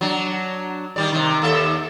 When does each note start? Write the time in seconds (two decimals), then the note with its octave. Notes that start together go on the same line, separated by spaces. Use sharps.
0.01 F#3 D4
0.96 D#3 G3 D5
1.12 C3 D#3
1.42 D#2 A4 E5